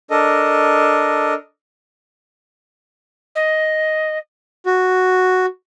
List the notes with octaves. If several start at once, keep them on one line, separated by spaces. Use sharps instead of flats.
D4 A4 A#4 D#5
D#5
F#4